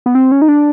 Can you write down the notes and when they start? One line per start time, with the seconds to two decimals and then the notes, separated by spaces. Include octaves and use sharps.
0.06 B3
0.15 C4
0.32 C#4
0.42 D#4
0.48 D4